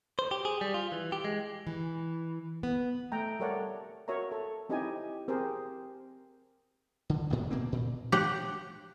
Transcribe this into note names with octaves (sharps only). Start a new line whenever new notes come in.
C5
G4
G#4
G3
F4
E3
G4
G#3
E3
B3
A3 G5 A#5
G3 A4 A#4 C#5 D5 F#5
F#4 A#4 C#5 E5 A#5
A4
C4 D#4 E4 G4 D#5 G#5
C4 G4 G#4 A#4 C5
D3
A1 D2 A2
B2 A#3 C4
A#2
G4 F#5